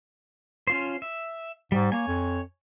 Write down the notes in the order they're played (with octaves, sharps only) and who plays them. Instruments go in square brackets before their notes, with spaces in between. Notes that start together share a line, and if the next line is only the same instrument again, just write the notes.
[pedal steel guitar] C#4 F4 C5
E5
[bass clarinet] G#2 [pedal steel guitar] G3
[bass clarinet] A#3 [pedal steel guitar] C#5 G#5
[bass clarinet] F2